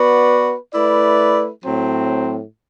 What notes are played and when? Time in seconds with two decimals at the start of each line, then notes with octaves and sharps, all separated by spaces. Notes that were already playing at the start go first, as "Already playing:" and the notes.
Already playing: B3 F#4 B4 D5
0.72 A3 E4 B4 D5
1.65 A2 F#3 C4